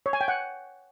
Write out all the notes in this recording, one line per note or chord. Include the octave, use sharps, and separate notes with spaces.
C#5
G#5
G5
F#5